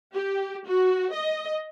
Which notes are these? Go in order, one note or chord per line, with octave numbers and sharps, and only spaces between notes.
G4
F#4
D#5